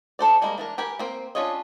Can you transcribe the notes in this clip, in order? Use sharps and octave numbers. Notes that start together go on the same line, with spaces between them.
D4 A4 C5 D5
G3 G#3 A#3 A#4
E3 D4 A#4
G4 A#4 B4 G#5
A#3 C4
C#4 D4 F4 C#5 D#5